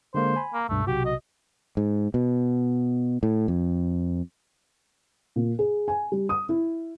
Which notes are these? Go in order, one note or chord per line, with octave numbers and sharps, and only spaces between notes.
D3 G#3 A#3 C5
G#5 B5
A#3
C#2 G2 B2 A3
B1 C3 F#4 G4
D#5
G#2
B2
A2
F2
A#2
G#4
G#5
G3
D#6
E4